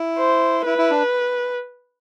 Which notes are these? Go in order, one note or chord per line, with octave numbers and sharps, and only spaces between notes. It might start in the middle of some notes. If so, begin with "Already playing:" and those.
Already playing: E4
C5
E4 B4
E4
D4